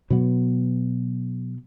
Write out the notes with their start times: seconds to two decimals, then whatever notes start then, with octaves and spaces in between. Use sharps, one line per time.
0.10 B2 F#3 B3